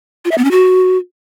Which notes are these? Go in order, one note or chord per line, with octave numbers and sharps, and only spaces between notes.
F4
E5
B3
C#4
F#4